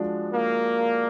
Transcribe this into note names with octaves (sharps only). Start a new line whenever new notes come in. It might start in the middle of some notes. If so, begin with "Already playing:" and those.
Already playing: F3 G#3 D4 F#4
A#3